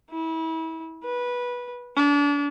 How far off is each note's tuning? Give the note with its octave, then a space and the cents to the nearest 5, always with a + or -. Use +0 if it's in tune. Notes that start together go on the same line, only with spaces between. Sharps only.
E4 -30
B4 -15
D4 -35